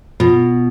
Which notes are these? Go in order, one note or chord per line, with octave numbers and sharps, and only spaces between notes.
B2 F4